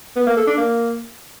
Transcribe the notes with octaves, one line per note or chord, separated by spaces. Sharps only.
B3
A#3
A4
D4
A#3